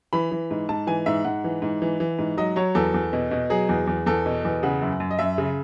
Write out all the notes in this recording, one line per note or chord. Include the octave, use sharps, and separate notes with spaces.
E3 B5
E3
G#2
G#2 A5
E3 G#5
G#2 E5
G#2 F#5
E3
G#2
E3
E3
G#2
F#3 D#5
F#3 C#5
E2 A4
E2
B2
B2
F#3 G#4
E2
E2
E2 A4
B2
E2
C#3 F#5
F#2
F#2
D#5
F#2 E5
C#3